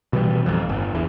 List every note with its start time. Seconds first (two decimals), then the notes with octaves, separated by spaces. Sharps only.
0.13 B2 E3 G3
0.46 A1 F2
0.69 G1
0.95 E2 E3